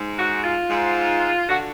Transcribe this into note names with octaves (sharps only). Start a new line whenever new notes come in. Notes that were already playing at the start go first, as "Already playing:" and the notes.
Already playing: G#2
F#4
F4
G#2
D3 F#4